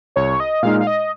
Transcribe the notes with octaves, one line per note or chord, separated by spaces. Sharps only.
C2 C#5
D#5
A#2 G#3 D#4 F5
F5
D#5